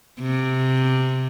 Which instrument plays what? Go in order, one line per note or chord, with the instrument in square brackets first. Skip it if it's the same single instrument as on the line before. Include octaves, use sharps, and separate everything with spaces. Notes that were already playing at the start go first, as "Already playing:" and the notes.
[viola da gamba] C3